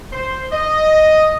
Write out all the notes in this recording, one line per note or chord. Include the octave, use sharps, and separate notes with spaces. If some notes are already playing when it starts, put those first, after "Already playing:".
C5
D#5